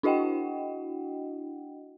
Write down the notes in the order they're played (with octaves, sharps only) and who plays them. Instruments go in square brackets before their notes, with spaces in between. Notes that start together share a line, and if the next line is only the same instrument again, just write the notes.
[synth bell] D4 E4 F#4 D#5 F#5 G5